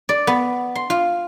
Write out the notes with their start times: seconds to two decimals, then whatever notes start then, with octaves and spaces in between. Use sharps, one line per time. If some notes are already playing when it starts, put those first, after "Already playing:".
0.09 D5
0.27 B3
0.75 C6
0.90 F4